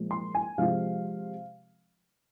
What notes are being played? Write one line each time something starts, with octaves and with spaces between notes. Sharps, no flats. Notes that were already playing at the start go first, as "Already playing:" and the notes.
Already playing: A#2 F3 G#3
C6
G#5
C3 F3 G#3 F4 F5